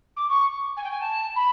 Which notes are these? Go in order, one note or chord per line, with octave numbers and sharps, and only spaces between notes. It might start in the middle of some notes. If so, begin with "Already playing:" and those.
D6
C#6
G#5
G5
G#5
A5
B5